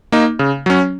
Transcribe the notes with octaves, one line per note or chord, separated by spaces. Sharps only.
A#3 D#4
C#3
F#3 C#4